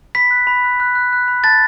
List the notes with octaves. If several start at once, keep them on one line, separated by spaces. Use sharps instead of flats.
B5 B6
F#6
B5
F#6
F#6
F#6
F#6
B5
A5 A6